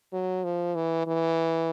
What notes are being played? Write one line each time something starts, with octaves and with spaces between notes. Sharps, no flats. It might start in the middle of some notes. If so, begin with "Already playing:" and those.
F#3
F3
E3
E3